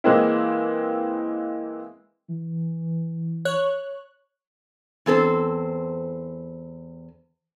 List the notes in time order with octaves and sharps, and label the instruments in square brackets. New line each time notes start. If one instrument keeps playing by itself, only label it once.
[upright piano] E3 G#3 A#3 C4 E4
[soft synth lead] E3
[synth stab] C#5 F#6
[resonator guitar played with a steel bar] E2 C4 A4 C5